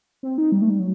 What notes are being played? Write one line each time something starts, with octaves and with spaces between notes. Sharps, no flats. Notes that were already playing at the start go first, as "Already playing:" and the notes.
C4
D#4
G3
A3
G3
F#3